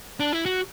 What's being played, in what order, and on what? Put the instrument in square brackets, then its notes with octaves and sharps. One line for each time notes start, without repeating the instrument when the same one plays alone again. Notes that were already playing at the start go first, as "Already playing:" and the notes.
[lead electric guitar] D4
E4
F#4